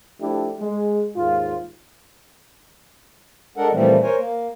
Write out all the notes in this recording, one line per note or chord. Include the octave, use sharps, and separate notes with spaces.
F3 A3 D4 E4 G4
G#3
D#2 G#2 F4
G#3 D4 A4 A#4 F#5
A#2 E3 F3 G3 A3 C4
A#4 C5 C#5 G#5
A#3